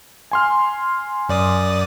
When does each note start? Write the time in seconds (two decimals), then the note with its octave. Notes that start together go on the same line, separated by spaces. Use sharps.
0.31 G#5 C6 F6
1.29 F#2 D5 D#6